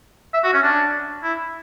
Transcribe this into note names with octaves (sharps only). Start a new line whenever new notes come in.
E5
F#4
C#4
D4
E4